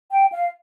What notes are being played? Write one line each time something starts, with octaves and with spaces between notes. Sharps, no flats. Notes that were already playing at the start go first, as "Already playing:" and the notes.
G5
F5